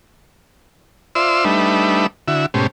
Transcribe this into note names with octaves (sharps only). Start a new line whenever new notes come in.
F4 C5 D5 E5 C6 E6
G3 A3 D4 D#4 B4 E5
D3 E4 F#4 E5
G#2 B2 A3 C#4 G4 C5